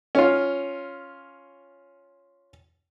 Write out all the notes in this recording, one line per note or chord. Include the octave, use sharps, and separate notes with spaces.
C#4 F4